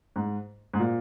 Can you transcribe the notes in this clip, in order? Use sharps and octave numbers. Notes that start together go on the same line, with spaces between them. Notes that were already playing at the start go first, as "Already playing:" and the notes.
G#2
G#2
A#2